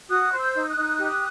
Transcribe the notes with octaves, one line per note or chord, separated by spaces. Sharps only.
F#4 D#6 F#6
C5
E6 G6
D#4
D#6 F#6
D#4
G4